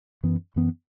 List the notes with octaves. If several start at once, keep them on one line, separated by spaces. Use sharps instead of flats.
F#2 E3 B3
F#2 E3 B3